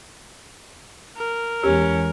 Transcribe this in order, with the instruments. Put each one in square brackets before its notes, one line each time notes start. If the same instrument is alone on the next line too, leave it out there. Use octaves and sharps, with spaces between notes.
[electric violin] A#4
[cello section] E2 G#3 [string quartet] C#4 [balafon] G4